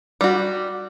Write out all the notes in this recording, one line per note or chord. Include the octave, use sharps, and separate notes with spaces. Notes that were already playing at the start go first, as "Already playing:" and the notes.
G3 F#4